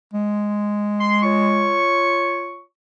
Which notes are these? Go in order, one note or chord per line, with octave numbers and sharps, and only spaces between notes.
G#3
C6
F4 C#5 C#6